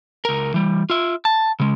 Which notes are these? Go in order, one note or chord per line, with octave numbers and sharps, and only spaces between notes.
C#2 A#4
E3 G3
F4 E5
A5
C#3 G#3